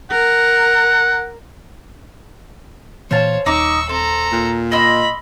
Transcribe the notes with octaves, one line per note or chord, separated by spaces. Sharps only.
A#4 F#5
A#2 E3 A#3 C5 C#5 F5 A5
D#1 D#4 C#6 D6 E6
C4 A4 A#5
A#2
D#5 B5 C6 E6